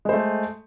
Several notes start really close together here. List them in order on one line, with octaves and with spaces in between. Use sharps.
G#3 C5 A3